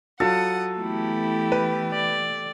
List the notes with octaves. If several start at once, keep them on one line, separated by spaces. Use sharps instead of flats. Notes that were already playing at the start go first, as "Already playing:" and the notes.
F#3 F4 A4 F#5 D#6
E3 A3 B3 E4 G4
B4
D5